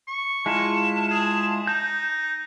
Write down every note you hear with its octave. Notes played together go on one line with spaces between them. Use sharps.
C#6
G#3 E4 F4 A5
G#4
D#4 G6